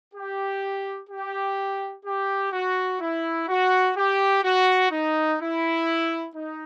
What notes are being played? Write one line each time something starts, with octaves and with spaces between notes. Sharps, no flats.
G4
G4
G4
F#4
E4
F#4
G4
F#4
D#4
E4
D#4